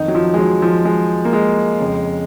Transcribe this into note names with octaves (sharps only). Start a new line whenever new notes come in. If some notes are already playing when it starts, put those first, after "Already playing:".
Already playing: F2 D#3 D#4
F#3
F3
G#3
F#3
F3
G#3
A#3
G#3
F2 C#3